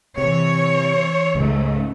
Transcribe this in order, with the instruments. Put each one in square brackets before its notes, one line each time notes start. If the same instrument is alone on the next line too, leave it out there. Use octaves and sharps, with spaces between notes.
[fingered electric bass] C3 [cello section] E3 C#5
[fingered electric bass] C#2 C#3 [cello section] G#2 A3